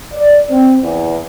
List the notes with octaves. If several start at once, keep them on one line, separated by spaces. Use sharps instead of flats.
D5
C4
E2